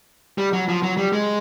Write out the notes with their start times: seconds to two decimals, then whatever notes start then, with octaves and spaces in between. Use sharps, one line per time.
0.38 G3
0.53 F#3
0.69 F3
0.83 F#3
0.97 G3
1.13 G#3